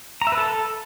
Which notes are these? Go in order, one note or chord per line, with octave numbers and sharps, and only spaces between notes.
A#5
E5
B4
A4